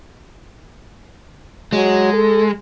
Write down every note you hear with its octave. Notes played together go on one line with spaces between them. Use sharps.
F#3 G#3
A4